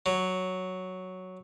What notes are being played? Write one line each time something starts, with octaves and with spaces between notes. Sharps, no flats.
F#3